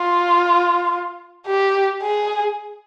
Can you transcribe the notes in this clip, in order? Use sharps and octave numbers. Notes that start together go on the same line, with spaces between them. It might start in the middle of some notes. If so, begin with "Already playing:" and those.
Already playing: F4
G4
G#4